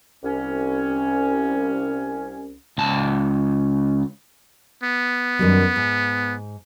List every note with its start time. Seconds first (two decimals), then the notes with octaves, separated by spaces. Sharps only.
0.23 C2 C#4
2.78 C#2 A5
4.84 B3
5.39 F#2 D#3 G3
5.76 G#2